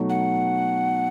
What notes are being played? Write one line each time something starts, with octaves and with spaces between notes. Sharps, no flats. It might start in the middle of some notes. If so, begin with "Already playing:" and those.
Already playing: B2 F#3 A3 D#4 F#4
F#5